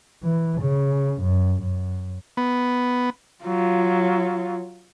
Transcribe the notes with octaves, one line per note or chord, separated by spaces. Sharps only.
E3
C#3
F#2
F#2
B3
F#3 F4